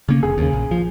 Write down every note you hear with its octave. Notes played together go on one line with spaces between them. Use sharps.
C#3 A#3 C#4
F1 G#4
D#2 C#3
A#1
F3